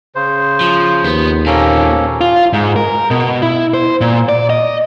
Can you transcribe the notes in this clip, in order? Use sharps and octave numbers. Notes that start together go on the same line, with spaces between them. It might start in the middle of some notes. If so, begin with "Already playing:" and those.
C#3 C5
F3
D#2 B3
A#2 A#3 C4 C#4 A4
F4
G#2
A#4
B2
E4
C5
A#2
D5
D#5